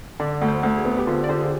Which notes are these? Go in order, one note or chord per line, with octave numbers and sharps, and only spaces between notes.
D3 D5
D2
C5
D2
G#4
B3
G4
D3 F4
D5
D3 C5
G#4